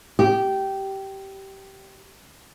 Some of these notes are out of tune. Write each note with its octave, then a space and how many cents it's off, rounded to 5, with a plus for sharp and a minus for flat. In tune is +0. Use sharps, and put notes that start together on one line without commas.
G4 -15